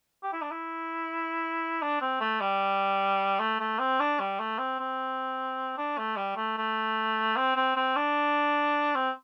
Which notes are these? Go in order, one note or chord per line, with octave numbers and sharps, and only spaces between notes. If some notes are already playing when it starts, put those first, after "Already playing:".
G4
E4
D4
E4
D4
C4
A3
G3
A3
A3
C4
D4
G3
A3
C4
C4
D4
A3
G3
A3
A3
C4
C4
C4
D4
C4